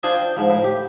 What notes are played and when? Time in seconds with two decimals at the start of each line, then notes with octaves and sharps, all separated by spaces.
0.03 D4 F4 C5 D5 D#5 G#5
0.15 G5
0.37 G#2 F3
0.50 A2
0.64 G4